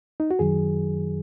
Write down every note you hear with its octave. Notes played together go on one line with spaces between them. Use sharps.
D#4
F#4
F#2 D#3 F#3 G#4